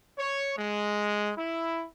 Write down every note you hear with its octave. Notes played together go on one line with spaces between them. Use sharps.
C#5
G#3
E4